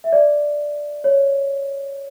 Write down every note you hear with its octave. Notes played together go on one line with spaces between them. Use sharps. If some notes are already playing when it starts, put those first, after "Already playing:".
E5
D5
C#5